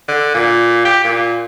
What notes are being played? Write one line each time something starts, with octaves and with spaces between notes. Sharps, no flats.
D3
A#2
G4
A#2